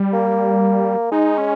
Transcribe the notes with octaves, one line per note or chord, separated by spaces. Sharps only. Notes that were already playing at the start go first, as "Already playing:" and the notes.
Already playing: G3
A#3
G#3 D#4
C#4